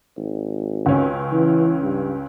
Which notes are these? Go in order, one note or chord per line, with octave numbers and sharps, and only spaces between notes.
G#1
C#2 C#4
E3
G2